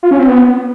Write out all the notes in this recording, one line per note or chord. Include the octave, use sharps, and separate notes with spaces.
F4
C#4
C4
B3